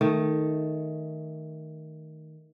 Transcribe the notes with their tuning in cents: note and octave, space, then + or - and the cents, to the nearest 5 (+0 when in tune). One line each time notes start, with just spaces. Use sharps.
D#3 +5 A3 +0